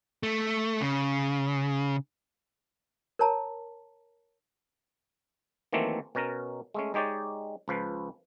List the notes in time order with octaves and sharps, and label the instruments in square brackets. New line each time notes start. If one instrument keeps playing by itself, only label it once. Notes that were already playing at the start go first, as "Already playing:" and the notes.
[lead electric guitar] A3
C#3
[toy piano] A#4 C#5 A5 A#5
[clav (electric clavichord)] D#3 E3 F#3 A3 A#3 C4
B2 C#4 A#4 A#5
G#3 A3 C#4
G#3 D#4 G4 C#5 D5
C#2 F3 B4